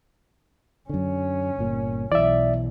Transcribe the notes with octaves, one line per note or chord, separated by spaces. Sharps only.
F#2 D3 C#4
G1 A#2
B1 E3 D5 E5